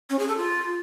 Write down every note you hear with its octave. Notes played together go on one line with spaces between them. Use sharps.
C#4
G#4
A4
F4